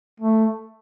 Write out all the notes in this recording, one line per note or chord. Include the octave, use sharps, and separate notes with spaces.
A3